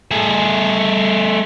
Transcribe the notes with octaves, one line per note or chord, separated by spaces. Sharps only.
A3 G#4